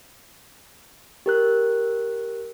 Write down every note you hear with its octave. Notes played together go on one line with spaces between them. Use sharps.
G4 A#4 F#6